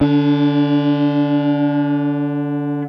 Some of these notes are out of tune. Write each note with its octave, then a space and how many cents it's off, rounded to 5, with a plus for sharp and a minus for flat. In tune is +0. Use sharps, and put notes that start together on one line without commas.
D3 +0 D4 -40